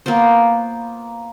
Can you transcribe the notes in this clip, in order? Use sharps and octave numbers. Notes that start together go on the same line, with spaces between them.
A#3 B3 F4 C5